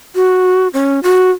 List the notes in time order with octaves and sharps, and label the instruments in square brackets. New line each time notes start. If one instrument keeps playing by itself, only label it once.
[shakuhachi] F#4
C#4
F#4